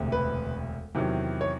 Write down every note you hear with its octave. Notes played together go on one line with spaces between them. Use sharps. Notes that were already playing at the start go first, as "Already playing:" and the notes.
Already playing: E1 D2 C3
B4
E2 C3 D#3 F#3
C#5